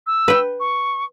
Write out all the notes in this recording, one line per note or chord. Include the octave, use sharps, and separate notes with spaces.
E6
B4 G5
C#6